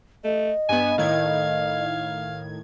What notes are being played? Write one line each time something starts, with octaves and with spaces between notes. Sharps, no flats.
A3 D#5
G2 B3 G#5
A2 D#3 F5 G#6